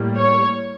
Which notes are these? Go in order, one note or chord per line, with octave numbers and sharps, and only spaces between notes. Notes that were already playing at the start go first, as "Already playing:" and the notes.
Already playing: A2 G3 A#3
C#5